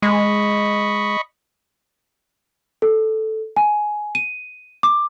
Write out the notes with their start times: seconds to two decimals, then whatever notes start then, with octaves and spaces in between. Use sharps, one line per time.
0.02 G#3 D#5 B5 C#6
2.82 A4
3.57 G#5
4.15 D#7
4.83 D6